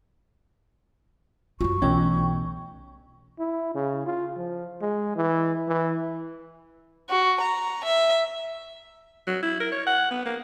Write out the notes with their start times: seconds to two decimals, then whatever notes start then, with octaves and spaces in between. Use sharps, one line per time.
1.61 F#2 F4 C#6
1.82 B1 E3 A3 C#4 F4 G5
3.39 E4
3.75 C#3
4.06 F4
4.37 F3
4.81 G#3
5.16 E3
5.68 E3
7.10 F#4
7.41 A#5
7.84 E5
9.27 F#3
9.43 E4
9.60 A#4
9.72 C#5
9.87 F#5
10.11 B3
10.26 A#3